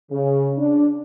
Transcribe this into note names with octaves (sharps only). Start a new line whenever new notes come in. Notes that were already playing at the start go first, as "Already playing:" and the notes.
C#3
D4